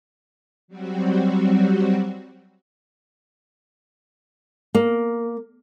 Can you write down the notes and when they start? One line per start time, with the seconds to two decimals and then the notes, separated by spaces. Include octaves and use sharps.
0.68 F#3 G3 C4 F#4
4.75 A#3